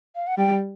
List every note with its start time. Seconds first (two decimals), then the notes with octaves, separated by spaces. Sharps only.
0.16 F5
0.27 F#5
0.38 G3 G5